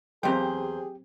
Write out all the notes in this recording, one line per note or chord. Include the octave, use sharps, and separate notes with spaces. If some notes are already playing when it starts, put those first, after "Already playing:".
E2 F#3 A#3 C4 G4 G#4 C5 G5